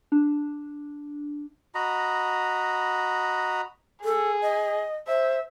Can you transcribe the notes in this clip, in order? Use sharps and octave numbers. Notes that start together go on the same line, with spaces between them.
D4
F#4 D#5 A#5 B5
G#4 A4
D#5
C5 E5